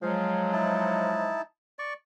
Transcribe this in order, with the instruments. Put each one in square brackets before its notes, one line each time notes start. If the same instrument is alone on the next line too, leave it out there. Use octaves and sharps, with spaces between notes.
[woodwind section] F3 F#3 G#3 [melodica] G#4 F5
[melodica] D#4 E4 A5
D5 C#6